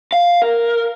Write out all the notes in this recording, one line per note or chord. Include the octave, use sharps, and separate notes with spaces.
F5
A#4